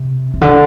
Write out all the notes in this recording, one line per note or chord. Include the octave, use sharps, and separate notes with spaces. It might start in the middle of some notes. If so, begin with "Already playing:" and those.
Already playing: C3
C3
D3